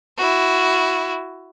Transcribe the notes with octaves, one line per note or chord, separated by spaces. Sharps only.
E4 F#4